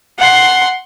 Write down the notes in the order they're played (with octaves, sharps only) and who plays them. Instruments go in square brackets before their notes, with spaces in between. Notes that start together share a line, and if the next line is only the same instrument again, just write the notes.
[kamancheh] F#5 C6